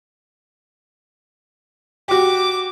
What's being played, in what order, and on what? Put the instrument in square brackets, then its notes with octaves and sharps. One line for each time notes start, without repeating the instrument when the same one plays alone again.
[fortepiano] F#4 G4 [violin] D6